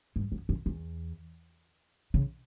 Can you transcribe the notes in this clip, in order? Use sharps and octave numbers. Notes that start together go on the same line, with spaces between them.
G2
F#2
F#2
E2
C#3